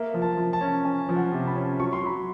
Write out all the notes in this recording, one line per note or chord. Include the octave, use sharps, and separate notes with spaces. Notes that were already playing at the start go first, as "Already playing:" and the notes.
Already playing: A#3 E5
F3
A5
F3
A5
C#4
C#4 G#5
F3
F#5
C3
B5
C#4
F#3 C#6
C6
F#3 B5